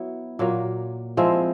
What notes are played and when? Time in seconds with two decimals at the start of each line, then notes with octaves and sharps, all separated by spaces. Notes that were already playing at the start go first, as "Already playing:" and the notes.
Already playing: F#3 B3 E4
0.39 A#2 F#3 A#3
1.17 F3 G#3 C4 E4